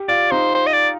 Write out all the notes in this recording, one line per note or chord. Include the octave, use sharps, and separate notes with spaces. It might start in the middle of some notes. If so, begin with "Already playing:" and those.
Already playing: G4
F4 D5
D#4 C5
C5
D#5
D5